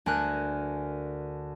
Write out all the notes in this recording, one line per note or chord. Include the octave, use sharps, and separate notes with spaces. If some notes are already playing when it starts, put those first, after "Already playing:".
D2 D4 A#4 G#5 F#6 G6